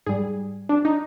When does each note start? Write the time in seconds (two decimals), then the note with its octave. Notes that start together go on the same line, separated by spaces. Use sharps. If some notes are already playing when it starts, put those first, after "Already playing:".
0.06 G#2 G3 G#4
0.69 D4
0.85 D#4